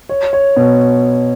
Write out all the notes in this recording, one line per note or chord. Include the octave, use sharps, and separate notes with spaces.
C#5
C#5
B2